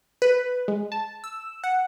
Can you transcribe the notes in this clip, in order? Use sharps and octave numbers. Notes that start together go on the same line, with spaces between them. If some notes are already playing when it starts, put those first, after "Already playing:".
B4
G#3
A5
E6
F#5